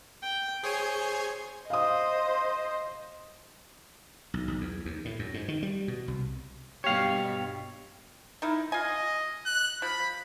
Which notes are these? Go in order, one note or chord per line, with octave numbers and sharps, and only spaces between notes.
G5
G#4 C5 C#5 G#5
C5 D#5 F5 D#6
B1
B1
E2
D#2
A2
F#2
G#2
D#3
G3
B2
C2
G2 B2 G4 C#5 F5
D#3 D#4 E4
F4 D#5 G#5
F#6
F3 B5